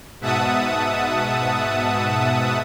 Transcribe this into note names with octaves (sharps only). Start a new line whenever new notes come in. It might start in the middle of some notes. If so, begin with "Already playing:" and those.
G#2 B2 E5 F#5 A5 D#6